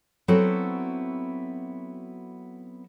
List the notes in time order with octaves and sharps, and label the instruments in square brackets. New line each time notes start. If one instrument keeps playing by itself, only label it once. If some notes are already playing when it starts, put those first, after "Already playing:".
[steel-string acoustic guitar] F#3 B3 C4 E4 F#4 A4